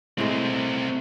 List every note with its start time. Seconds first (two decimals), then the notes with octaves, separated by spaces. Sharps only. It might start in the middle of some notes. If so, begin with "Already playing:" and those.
0.18 A2 G#3 C4 E4